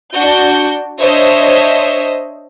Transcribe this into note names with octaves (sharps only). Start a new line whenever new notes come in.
D4 F#4 G6
D4 C5 C#5 D#5 E5